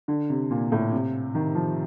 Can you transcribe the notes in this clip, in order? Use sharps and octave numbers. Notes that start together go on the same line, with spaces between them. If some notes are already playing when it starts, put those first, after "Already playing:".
D3
C3
A#2
A2
C3
D#3
F3